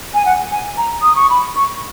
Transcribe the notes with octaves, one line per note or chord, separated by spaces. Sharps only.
G#5
F#5
G#5
A#5
D#6
C#6
B5
C#6